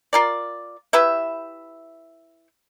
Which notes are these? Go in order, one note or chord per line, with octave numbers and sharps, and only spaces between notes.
F4 A#4 D5
E4 G4 B4 E5